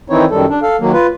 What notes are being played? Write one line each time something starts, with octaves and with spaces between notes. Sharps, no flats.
D#3 E3 C4 D#4 E4 C#5
F#2 D#3 G3 A4
D4
A4 F5
D#3 F#3 A#3
F4 B4